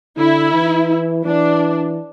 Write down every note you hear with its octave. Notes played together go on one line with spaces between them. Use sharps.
D3 E4
E3
E3 D4